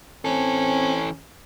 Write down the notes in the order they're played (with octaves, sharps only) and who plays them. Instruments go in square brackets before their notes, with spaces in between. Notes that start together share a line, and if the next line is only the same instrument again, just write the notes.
[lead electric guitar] E3 A4 [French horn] C4 [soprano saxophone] C#4